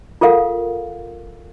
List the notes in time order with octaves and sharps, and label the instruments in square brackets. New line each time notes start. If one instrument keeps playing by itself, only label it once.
[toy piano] F4 A4 A#4 F5 F#5